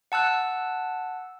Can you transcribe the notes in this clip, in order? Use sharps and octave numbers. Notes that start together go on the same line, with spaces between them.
F#5 A5 E6 F#6